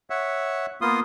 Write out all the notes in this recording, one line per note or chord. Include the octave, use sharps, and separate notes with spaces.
C#5 E5 F#5
A#3 B3 F4 C6 D#6